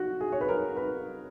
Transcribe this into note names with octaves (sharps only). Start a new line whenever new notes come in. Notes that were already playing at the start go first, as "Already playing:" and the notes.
Already playing: F#4
G#4
C#5
B4
A#4
B4